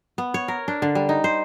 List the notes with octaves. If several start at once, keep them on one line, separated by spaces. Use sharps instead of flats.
B3
C#5
A#4
D4
D3
G3
D#4
C5